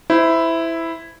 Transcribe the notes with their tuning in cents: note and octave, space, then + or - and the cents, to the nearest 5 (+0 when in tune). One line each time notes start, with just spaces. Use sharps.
E4 +0 C5 -25